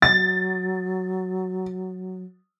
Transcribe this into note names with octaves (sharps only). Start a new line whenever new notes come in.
F#3 A6